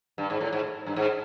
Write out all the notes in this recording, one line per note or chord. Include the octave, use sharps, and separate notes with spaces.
G2
G#2
A2
G#2
G2
G#2